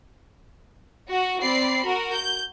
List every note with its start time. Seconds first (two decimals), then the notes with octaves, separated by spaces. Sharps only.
1.10 F#4
1.42 C4 D5 B5 C7
1.84 F#4 A#4
2.13 G6